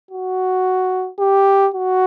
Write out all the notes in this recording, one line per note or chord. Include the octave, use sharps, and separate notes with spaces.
F#4
G4
F#4